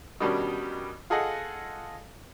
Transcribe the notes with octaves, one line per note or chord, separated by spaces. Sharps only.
B2 D#3 G3 C#4 D4
F4 G#4 A4 D#5 F#5